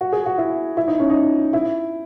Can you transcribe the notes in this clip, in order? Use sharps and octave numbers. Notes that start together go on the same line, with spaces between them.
F#4
G#4
F#4
E4
E4
D#4
C#4
D#4
E4